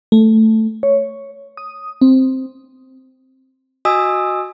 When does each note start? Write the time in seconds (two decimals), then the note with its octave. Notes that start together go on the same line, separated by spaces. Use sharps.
0.12 A3
0.83 C#5
1.57 D#6
2.01 C4
3.85 F#4 D#5 G#5 D#6 E6